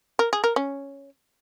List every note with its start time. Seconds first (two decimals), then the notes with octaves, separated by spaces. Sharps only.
0.19 A#4
0.33 G#4
0.44 A#4
0.56 C#4